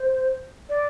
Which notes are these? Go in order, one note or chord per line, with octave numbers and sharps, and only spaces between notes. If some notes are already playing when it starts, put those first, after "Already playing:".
Already playing: C5
D5